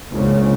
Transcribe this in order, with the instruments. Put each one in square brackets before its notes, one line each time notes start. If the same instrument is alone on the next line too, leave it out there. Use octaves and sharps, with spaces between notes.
[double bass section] C#2 C#3 [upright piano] G#2 F3 A#3 D4